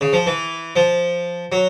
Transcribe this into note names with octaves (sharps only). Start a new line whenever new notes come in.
C#3
F3
E3
F3
F#3